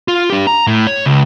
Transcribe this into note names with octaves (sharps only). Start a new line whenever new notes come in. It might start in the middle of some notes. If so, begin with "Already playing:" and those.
F4
D4 G4
A#5
A2
C#5
C#2